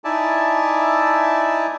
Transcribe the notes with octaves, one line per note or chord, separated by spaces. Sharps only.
D#4 E4 D5 E5 G#5 A5